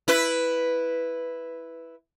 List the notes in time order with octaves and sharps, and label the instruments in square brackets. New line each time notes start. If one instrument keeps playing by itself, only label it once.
[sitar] E4 B4